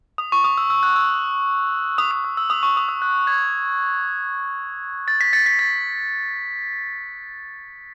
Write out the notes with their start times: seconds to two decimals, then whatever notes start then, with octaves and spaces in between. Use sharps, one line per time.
0.18 D#6
0.32 C#6
0.44 D#6
0.58 E6
0.70 E6
0.83 F#6
0.96 E6
1.98 D#6
2.11 D#6
2.24 E6
2.37 E6
2.50 D#6
2.63 C#6
2.77 D#6
2.89 E6
3.02 F#6
3.27 G#6
5.08 A6
5.21 B6
5.33 A6 C#7
5.46 B6
5.59 A6